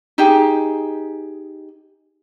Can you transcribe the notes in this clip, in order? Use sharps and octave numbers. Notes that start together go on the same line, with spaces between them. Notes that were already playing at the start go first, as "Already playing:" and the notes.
D#4 G4 G#4